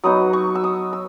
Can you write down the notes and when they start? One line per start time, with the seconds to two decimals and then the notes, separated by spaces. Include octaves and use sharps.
0.04 F#3 B3 D#4 D#6
0.33 C#6
0.55 E6
0.64 D#6
0.93 E6